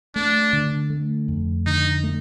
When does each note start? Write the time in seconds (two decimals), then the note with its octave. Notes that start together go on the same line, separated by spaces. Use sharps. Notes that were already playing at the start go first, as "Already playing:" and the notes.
0.15 A3 D4
0.53 D3
0.90 A3
1.28 F2
1.66 D3 D#4
2.04 A3